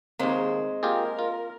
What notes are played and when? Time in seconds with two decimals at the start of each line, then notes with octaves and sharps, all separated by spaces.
0.20 D#2 G#3 A#3 C4 C5
0.83 A#3 F4 G4 G#4 A#4
1.19 F4